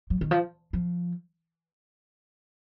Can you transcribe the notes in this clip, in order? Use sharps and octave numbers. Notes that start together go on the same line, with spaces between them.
F#3
D#3
F3
F3